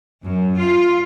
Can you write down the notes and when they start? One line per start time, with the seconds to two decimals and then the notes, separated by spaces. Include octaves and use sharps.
0.25 F#2
0.57 F4